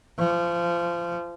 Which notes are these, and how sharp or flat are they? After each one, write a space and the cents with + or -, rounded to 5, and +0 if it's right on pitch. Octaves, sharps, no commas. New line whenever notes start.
F3 -25